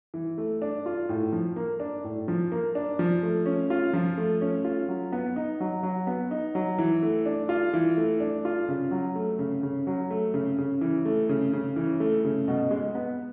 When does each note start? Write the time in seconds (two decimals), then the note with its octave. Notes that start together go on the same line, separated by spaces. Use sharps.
0.14 E3
0.38 A3
0.62 D4
0.86 F4
1.09 A2
1.33 F3
1.56 A#3
1.80 D4
2.04 A2
2.28 F3
2.52 A#3
2.75 D4
2.99 F3
3.23 A3
3.46 C#4
3.70 F4
3.93 F3
4.18 A3
4.41 C#4
4.64 F4
4.88 F#3
5.12 B3
5.36 D#4
5.60 F#3
5.83 F#3
6.07 B3
6.31 D#4
6.55 F#3
6.78 E3
7.03 A3
7.26 D4
7.49 F4
7.74 E3
7.97 A3
8.20 D4
8.45 F4
8.69 C#3
8.91 F#3
9.15 A3
9.39 C#3
9.63 C#3
9.87 F#3
10.10 A3
10.34 C#3
10.58 C#3
10.81 E3
11.05 A3
11.29 C#3
11.53 C#3
11.76 E3
12.00 A3
12.25 C#3
12.48 B2
12.71 G#3
12.95 B3